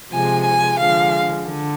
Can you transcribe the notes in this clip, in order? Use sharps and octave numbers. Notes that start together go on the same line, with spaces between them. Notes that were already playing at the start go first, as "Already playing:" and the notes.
C3 F3 G#3 G#5
G#5
D3 F3 G#3 F5
D3